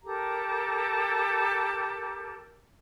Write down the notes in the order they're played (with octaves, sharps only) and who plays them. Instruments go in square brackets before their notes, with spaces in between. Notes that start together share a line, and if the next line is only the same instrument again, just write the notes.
[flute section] G4 A4 A#4 A#5